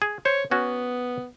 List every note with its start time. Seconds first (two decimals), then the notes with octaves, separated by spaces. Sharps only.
0.02 G#4
0.25 C5 C#5
0.51 B3 C#4 F#4